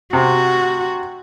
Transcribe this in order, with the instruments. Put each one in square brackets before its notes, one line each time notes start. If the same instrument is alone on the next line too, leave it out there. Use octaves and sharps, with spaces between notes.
[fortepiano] C3 [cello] F#4